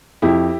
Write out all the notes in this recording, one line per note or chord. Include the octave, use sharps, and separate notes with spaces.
F2 E4 G4